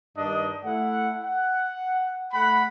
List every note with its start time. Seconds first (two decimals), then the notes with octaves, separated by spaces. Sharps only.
0.17 G2 D#3 D4 D#5
0.64 A3 E4 F#5
1.23 F#5
2.32 A3 F#5 B5